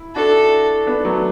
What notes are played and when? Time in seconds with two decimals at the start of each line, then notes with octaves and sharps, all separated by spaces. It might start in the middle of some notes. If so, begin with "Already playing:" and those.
Already playing: E4
0.16 D4 F#4 A4
0.87 B3 D4
1.05 F#3 A3